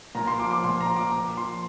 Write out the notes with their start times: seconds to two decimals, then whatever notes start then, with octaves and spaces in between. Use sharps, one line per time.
0.15 A#2 A#5
0.27 C6
0.39 F3 D6
0.51 D6
0.64 A#2 C6
0.81 A#5
0.88 F3
0.96 D6
1.12 A#2 D6
1.37 F3 C6